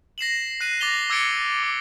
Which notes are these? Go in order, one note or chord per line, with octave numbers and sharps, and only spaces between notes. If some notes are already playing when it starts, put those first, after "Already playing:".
A#6 C7 E7 F#7
F#6 C7 D#7
D6 A6 A#6 F7 G7
D6 E6 G#6 A6 C#7 D7
D6